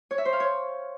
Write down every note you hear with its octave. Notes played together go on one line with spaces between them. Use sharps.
C#5
E5
C5
F5
C#5